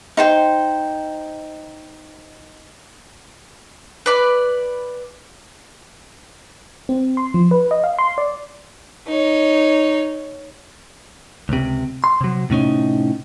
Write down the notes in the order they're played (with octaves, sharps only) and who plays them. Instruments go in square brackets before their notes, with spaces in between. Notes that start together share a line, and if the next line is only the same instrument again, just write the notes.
[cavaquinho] D#4 C5 G5
[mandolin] B4 D5
[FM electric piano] C4
C6
F3
B4
D#5
F5
C6
D5
[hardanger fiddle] D#4 C#5
[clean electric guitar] C#2 C3
C6
C3 F#3
A2 C3 C#4 D#4